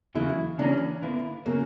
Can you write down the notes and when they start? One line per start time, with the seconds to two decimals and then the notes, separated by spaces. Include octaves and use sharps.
0.15 E2 C#3 F#3 A#3 E4
0.58 C#3 E3 G3 A#3 C#4 D4
1.02 D3 A#3 B3 E4
1.46 C#3 F#3 A#3